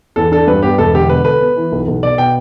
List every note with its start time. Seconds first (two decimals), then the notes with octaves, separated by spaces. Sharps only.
0.16 E2 A4
0.32 D4 A4
0.47 G2 B4
0.62 B3 G4
0.78 E1 A4
0.94 D3 G4
1.09 B2 B4
1.24 A4 B4
1.41 B3
1.56 E3
1.72 B1
1.87 B1
2.03 B2 D5
2.18 B2 G5